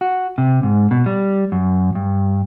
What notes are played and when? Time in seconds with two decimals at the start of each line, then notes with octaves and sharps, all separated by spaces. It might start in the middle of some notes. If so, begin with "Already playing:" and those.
0.01 F#4
0.38 C3
0.63 G#2
0.91 B2
1.06 G3
1.52 F#2
1.95 G2